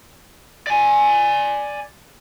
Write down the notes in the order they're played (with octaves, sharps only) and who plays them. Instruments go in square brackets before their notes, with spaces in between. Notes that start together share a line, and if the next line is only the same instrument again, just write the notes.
[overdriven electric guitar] D5 G#5